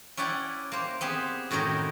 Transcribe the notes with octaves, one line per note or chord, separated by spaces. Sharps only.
C#4 E4 D5 F#5 G5
A#3 C5
B3 C4 G4 G#4
F#2 A2 D#3 F#3 A#4 G5